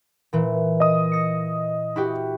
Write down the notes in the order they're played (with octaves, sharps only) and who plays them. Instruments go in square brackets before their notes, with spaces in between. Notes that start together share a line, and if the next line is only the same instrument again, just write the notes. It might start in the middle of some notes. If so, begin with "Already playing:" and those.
[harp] A#2 E3
[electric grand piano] D#5 D#6
[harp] A#6 C#7
E4 F#4 G4